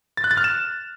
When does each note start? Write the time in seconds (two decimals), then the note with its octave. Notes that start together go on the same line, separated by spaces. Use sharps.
0.17 A6
0.24 F#6
0.31 A6
0.37 F6
0.44 E7